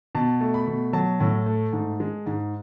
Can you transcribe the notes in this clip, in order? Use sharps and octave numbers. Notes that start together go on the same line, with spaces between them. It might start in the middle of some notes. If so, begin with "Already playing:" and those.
B2 A5
A3
B5
B2
F#3 A5
A2
A3
G#2
G#3
G#2